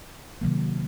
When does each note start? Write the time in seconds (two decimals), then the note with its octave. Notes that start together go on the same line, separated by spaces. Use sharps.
0.41 C3 D#3 F#3 A#3